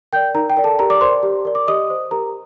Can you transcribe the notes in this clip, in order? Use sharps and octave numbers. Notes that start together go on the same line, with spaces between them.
A#4 D5 G5 G6
D#4 A#4 A#5
G5
A#4 D5
A4 A5
G4 A#4 A#5
D5 D6
A#4 C5 D5 C6
G4
A#4 D5
D6
G4 D#5 D#6
C5
G4 A#4 A#5